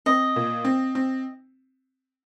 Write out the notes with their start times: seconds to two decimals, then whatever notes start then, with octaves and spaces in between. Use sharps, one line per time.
0.06 C4 D#5
0.36 A#2
0.65 C4
0.95 C4